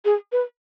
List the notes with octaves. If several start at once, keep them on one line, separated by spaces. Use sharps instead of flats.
G#4
B4